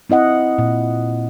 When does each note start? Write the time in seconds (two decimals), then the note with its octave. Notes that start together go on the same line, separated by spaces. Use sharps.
0.10 C4 E4 D#5 F#5
0.58 A#2